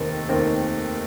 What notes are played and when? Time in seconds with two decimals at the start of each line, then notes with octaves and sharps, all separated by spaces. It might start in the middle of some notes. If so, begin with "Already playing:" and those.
Already playing: F1 D#2 D#3 C4
0.29 F1 D#2 D#3 C4